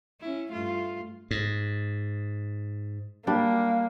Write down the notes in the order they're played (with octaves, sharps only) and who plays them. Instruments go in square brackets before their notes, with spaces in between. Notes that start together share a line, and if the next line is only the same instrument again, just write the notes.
[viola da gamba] C#4 E4
G2 A3 F4
[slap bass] G#2
[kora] G3 D4 [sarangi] A#3